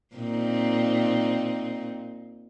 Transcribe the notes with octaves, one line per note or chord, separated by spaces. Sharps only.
A#2 C4 D#4